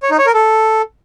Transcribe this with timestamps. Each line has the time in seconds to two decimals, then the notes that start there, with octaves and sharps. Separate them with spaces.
0.03 C#5
0.11 D#4
0.18 C#5
0.26 A#4
0.34 A4